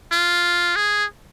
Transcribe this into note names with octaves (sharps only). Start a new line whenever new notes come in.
F4
G#4